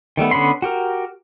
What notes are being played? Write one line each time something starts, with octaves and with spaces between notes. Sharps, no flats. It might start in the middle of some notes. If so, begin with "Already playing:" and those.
D#3 G3 A3 B3
D3 B3 C#4 B5 C6
F#4 G4 A#4